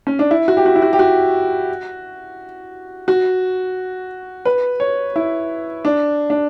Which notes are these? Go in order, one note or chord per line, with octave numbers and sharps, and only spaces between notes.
C#4
D4
E4
F#4
G4
F#4
E4
F#4
G4
F#4
F#4
B4
C#5
E4
D4
D4